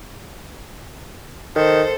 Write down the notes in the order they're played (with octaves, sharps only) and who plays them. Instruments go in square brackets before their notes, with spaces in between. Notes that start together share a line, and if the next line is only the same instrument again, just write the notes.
[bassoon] D#3 [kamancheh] A4 C5